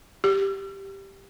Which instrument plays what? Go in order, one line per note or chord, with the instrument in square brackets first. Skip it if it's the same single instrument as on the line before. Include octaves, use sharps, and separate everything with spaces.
[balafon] G4